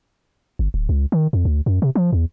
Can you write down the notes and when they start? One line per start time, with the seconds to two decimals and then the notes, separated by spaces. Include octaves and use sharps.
0.59 G1
0.74 D1
0.89 C#2
1.12 D#3
1.33 F2
1.45 D2
1.66 F#2
1.82 C3
1.95 F3
2.13 E2